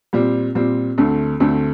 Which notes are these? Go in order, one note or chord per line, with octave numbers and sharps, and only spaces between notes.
A#2 G3 C4
A#2 G3 C4
D2 D3 A3 C4
D2 D3 A3 C4